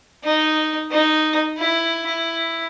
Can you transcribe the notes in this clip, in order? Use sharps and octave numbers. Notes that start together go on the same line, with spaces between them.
D#4
D#4
E4
E4